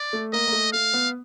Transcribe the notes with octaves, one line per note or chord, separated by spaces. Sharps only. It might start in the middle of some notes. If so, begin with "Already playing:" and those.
Already playing: D5
A3
A#3 D#5
A#3
A3
A3 F5
B3